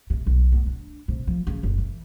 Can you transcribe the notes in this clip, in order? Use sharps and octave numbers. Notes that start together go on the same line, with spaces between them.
C3
B1
B3
D4
C3
F3
C#3
F#1
E3